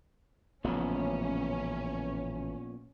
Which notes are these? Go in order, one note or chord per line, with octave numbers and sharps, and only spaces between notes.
A1 A#2 C#3 F3 B3 C#4